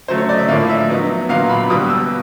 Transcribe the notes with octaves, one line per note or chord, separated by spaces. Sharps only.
C#3 F#3 A3 C5
C#5
D5
D#5
E5
A2 F3 A#3 D4 F5
E5
F#3 B3 D#4
A#2 F#3 B3 F5
B5
B2 G3 B3 D#6
E6